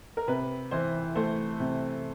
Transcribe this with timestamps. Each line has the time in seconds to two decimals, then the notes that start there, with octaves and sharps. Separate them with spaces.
0.17 A#4
0.28 C3 B4
0.71 E3 C5
1.15 A3 C5
1.60 C3